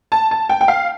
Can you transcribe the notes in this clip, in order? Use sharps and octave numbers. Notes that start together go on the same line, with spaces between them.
A5
A5
G5
G5
F5